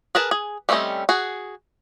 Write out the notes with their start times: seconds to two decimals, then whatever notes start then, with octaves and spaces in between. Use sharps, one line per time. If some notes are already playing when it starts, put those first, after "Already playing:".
0.15 G#4 A#4 B4 A5
0.31 G#4
0.69 G3 A3 C4 C#4 D#5
1.09 F#4 G#4